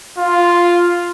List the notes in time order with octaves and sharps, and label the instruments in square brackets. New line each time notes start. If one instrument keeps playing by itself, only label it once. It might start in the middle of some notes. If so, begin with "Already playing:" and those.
[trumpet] F4